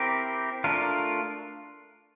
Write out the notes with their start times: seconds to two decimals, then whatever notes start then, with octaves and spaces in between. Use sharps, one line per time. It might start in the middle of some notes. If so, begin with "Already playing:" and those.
Already playing: C4 E4 G4 A#4
0.64 A3 D4 F4 A#4